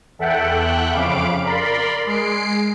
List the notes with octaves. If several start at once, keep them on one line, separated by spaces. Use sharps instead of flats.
E2 A4 E5 F#5 G5 F#6
F2 C#3 F5 B5 D6 D7
A#4 D5 B5 C6
G#3 C7 D7